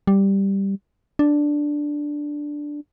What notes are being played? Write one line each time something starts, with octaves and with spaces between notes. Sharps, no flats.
G3
D4